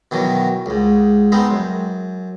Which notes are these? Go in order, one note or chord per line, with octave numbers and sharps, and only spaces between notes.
B2 D#3 E3 F#3
C#2 G#2
G#3 B3 C4 D#4 C5
F#2